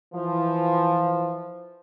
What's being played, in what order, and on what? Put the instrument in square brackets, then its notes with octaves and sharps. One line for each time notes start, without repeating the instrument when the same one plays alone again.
[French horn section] E3 F3